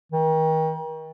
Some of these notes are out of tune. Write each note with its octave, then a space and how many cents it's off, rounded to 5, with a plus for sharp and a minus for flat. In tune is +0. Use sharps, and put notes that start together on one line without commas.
D#3 +35